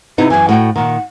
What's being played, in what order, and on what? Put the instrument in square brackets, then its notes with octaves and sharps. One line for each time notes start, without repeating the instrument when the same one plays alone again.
[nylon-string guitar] C3 B3 D#4 [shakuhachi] E4
[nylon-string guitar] F#2 E3 [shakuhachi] G#5
[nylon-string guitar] A2 F#4 G5 [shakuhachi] F#5
[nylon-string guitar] A#2 D#3 [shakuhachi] F#5